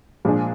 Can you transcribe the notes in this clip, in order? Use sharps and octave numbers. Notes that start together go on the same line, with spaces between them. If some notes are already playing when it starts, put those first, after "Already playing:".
A#2 F3 G#3 D4 G#4